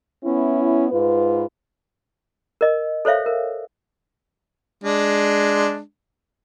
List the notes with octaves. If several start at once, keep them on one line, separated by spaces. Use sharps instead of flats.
B3 C#4 E4
G#2 F4 B4
A#4 D#5
A4 C5 C#5 E5 F5
A#4
G#3 D4